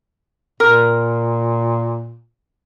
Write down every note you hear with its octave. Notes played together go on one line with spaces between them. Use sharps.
A#2 A#4